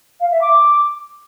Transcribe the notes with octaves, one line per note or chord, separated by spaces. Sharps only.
F5
E5
D6